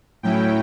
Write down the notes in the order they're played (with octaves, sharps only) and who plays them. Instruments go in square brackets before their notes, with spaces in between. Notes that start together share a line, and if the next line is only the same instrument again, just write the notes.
[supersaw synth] A2 F#3 C#4 E4 G5